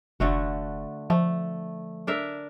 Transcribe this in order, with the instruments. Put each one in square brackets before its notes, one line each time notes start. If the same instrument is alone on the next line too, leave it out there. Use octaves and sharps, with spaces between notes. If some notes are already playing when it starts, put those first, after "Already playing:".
[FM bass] F1 [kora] D3 A3 F#4
[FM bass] F3 [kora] A3
[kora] D4 A#4 E5